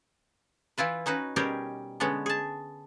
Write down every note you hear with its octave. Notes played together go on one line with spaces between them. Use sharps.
E3 E4 F4 B4
C#4 D#4 F#4 B4
B2 G3 C#4 G4 G#4 A#4
D3 G#3 B3 C#4
G#4 A5